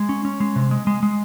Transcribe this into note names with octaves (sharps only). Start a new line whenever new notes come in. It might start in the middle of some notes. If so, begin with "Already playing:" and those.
Already playing: G#3
C#4
C#4
G#3
C3
G#3
G#3
G#3